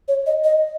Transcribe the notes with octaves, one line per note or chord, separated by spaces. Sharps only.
C#5
D#5
D#5